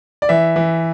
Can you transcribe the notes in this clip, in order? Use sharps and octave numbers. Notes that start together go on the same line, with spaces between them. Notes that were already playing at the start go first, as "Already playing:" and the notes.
D5
E3 E5
E3